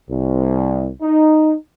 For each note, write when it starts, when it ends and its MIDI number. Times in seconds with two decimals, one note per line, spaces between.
0.11 0.89 36
1.02 1.55 63